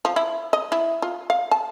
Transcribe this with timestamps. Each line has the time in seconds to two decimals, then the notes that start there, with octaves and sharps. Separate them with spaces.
0.05 F3
0.16 E4
0.53 D#5
0.72 E4
1.02 F4
1.30 F5
1.51 A5